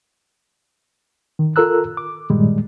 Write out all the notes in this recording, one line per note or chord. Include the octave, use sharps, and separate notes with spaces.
D#3
F4 A4 A#4 A#5 E6 F#6
D6
G2 A#2 D#3 G3 G#3